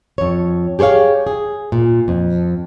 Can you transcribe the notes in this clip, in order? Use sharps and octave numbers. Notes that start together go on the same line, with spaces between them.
F2 C#5
G4 G#4 C5 C#5 F5
G#4
A#2
F2